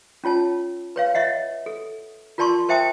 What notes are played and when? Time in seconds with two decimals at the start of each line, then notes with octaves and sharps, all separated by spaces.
0.24 C#4 F4 C#5 A5
0.96 B4 C#5 F5
1.15 C#5 D#5 E5 F#5
1.66 A4
2.38 F4 A#4 D5 A5 C6 C#6
2.69 A#4 C5 E5 G5 A5 D#6